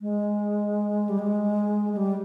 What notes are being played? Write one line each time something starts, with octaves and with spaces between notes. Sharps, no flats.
G#3
G3
G#3
G#3
G3